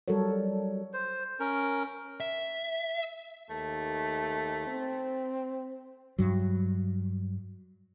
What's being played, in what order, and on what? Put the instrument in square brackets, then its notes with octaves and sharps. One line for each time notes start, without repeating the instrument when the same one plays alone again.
[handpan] F#3 G3 F#4 A4 A#4 C#5
[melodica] C5
C#4 A#4
[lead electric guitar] E5
[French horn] D#2 [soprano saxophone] A3
[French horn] C4
[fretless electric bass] G2 F#3